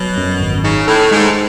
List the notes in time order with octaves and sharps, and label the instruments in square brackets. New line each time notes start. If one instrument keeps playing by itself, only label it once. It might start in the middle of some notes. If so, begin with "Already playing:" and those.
Already playing: [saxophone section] B2 [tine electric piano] F#3
[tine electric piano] F#2
G#1
[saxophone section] C#3 [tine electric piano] D#4
[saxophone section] A2 [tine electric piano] A4
[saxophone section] G#2 [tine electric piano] G#3